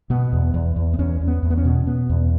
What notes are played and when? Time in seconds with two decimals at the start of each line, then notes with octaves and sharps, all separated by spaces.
0.10 B2 B3
0.33 E2
0.54 E2
0.76 E2
0.94 B3
0.99 E2 C#4
1.21 E2
1.27 B3
1.43 E2
1.50 B3
1.57 C#4
1.65 B2
1.87 B2 B3
2.09 E2